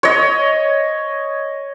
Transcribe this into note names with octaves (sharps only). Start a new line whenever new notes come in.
C#5 D#5